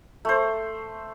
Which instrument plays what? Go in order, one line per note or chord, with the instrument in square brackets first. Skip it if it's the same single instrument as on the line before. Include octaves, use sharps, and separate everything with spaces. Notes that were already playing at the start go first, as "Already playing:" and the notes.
[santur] A3 C5